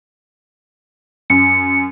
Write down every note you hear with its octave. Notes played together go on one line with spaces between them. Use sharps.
F#2 C#7